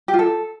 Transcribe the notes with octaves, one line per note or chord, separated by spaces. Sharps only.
G4
F4
A4